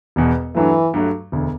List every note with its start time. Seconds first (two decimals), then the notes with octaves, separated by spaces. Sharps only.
0.16 E1 E2 B2
0.55 G2 E3 F#3 A3
0.94 G2 F#3 A3
1.32 E1 D2 D3